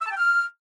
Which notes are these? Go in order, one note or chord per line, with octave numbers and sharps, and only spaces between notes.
E6
A5
G5
F6